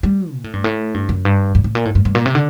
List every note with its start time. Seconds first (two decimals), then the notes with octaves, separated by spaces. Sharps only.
0.03 G3
0.34 A#2
0.44 A2
0.53 G2
0.64 A2
0.94 G2
1.09 F#2
1.25 G2
1.55 G2
1.64 A2
1.75 A#2
1.85 A2
1.95 G2
2.05 G2
2.15 A#2
2.26 C3
2.35 D3